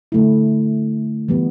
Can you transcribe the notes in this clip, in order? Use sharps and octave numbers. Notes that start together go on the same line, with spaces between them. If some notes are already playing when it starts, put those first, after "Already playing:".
D3 A3 E4
E3 G3 B3